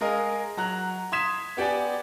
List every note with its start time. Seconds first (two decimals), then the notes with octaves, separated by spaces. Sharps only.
0.01 G#3 G#4 A#4 D#5 F5
0.57 F#3 A#5 F#6
1.12 C6 D#6 G#6 B6 E7
1.57 B3 G4 D5 F#5 G#5